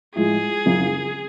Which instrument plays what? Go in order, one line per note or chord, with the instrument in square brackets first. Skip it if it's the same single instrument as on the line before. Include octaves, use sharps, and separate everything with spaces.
[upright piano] A2 F3 G#3 [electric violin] G#4
[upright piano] F#1 F#2 C#3 F3